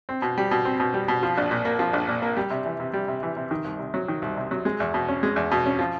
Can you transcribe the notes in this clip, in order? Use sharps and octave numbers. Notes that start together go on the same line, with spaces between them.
C4
B2
G3
B2
C4
B2
G3
B2
F3
A#1
A#2
A#3
F3
A#1
A#2
A#3
G3
C3
E3
C3
G3
C3
E3
C3
D#3
C2
C3
F#3
D#3
C2
C3
F#3
G#3
E2
B2
C#4
G#3
E2
B2
C#4
F3